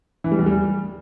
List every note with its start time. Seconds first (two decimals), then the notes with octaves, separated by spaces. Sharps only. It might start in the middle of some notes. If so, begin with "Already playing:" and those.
0.24 E3
0.32 G3
0.39 E2
0.46 G3